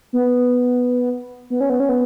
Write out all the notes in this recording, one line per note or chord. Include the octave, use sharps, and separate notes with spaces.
B3
B3
C#4
B3
C#4
B3